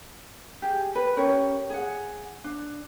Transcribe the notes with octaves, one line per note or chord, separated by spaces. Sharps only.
G4 G#4
B4
C#4 G4 A#4 C#5
G#4 F#5
D4